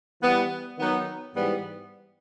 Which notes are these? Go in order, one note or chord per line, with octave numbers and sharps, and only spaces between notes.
E3 G3 B3
D#3 F#3 B3 D#4
G#2 E3 G3 B3